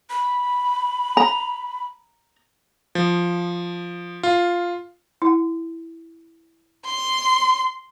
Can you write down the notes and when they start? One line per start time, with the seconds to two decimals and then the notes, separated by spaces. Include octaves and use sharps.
0.10 B5
1.17 A#5
2.95 F3
4.23 F4
5.22 E4 F#5
6.86 C6